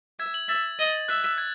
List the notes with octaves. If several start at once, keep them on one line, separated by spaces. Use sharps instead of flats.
E5 G#6
F#7
E5 A6
D#5
E5 F#6
F#6
G#6